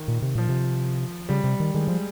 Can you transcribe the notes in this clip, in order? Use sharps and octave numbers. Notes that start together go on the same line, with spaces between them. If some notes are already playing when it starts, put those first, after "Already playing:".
Already playing: D#3
A#2
C3
A#2 F3
C3
C#3 G3
C3
D#3
D#3 G#3
F3